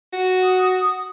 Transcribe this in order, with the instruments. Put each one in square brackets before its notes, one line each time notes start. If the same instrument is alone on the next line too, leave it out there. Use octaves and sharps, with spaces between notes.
[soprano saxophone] F#4
[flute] D#6